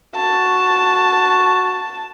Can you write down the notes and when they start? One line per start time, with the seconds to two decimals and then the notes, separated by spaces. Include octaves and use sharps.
0.16 F#4 A5